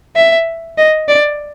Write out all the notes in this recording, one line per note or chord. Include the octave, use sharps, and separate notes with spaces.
E5
D#5
D5